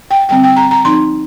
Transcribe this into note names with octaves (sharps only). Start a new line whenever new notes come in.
G5
D3 G3 C4 G5
G5
A#5
A#5
F3 C4 D#4 C6